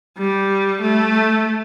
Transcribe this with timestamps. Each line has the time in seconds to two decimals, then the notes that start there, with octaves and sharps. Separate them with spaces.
0.18 G3
0.81 A3